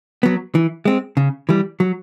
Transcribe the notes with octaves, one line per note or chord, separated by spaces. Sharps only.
F#3 B3
E3
G#3 C4
C#3
E3 G3
F#3